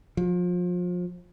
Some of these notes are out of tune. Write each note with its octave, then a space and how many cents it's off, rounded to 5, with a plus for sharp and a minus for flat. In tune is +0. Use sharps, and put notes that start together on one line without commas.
F3 +30